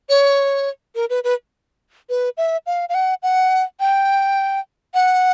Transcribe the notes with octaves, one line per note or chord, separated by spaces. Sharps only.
C#5
A#4
B4
B4
B4
E5
F5
F5
F#5
F#5
G5
F#5